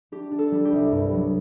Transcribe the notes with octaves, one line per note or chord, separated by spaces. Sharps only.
D4 G4
D4
A4
G3
G4
C2
G2
F#3